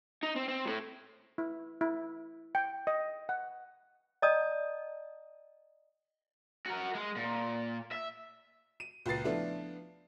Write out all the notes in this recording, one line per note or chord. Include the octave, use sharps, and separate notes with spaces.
D#4
C4
C4
A2 A3
E4
E4
G5
D#5
F#5
D5 D#5 G5 A5 A#5 D#6
F#4 A#4
G#3
A#2
E5
D#7
C#2 A#2 B4 A6 C7
F3 A3 B3 D4 E4 F4